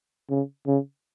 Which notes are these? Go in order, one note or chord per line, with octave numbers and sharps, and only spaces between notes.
C#3
C#3